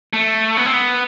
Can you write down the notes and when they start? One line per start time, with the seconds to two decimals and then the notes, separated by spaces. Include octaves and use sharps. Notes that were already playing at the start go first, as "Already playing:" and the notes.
0.13 A3
0.57 B3
0.66 C4
0.74 B3